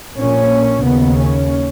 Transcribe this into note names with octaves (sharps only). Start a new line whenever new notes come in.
A#1 A#2 C#4
D#2 C#3 B3
C#4